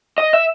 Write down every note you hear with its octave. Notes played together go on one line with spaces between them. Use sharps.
D#5
E5